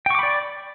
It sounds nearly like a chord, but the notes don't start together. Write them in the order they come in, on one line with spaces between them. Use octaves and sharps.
G5 C#6 D6 B5 D5